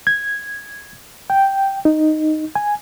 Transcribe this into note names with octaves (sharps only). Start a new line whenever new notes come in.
G#6
G5
D#4
G#5